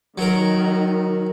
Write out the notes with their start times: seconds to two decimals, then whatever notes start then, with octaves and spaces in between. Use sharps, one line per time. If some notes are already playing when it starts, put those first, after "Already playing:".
0.18 D#3 F#3 A#4